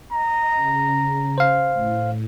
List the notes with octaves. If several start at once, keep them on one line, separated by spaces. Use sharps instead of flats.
D#5 A#5
C#3
C5 F5
A2